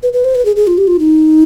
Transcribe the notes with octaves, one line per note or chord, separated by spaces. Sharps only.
B4
B4
C5
B4
G#4
G#4
F4
G4
F4
D#4